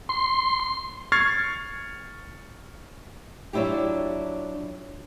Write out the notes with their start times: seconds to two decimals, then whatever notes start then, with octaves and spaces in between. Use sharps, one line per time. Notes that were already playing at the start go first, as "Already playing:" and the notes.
0.09 C6
1.12 C#6 F6 G#6 A6 C7
3.53 F#3 D4 E4 F4 G4